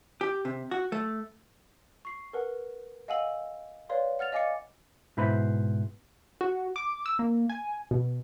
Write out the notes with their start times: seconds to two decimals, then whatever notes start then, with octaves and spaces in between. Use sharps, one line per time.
0.21 G4
0.45 C3
0.71 F#4
0.92 A3
2.05 C#6 C7
2.33 A#4 B4 F#5
3.08 D#5 F5 F#5 G#5 E6 F#7
3.89 B4 C#5 D5 F5 C6
4.19 F#5 F6 A6 F7
4.32 D#5 F5 G#5 D6 A6 C#7
5.17 G#2 B2 E4 B4 C5 B5
6.41 F#4
6.76 D6
7.06 E6
7.19 A#3
7.50 G#5
7.91 B2